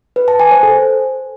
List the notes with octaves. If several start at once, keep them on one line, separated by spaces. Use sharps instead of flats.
B4
A5
G#5
C5
A4